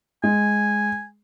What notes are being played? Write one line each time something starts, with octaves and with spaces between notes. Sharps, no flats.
G#3 G#5